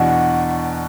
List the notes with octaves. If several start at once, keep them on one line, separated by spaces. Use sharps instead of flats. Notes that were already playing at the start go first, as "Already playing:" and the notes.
Already playing: E2 B2 D4 F#4